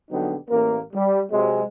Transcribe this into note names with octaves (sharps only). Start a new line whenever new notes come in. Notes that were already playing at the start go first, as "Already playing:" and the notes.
A#1 D3 F#3 B3 D#4 G4
A1 A#3 A#4
G3
C3 F#3 G#3